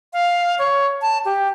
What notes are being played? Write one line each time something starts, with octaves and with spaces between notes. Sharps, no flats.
F5
C#5
A5
G4